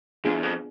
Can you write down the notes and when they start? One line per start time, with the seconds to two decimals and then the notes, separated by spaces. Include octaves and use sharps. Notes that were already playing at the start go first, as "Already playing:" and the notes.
0.25 F2 B3 D4 F4 G#4
0.34 E2
0.43 F2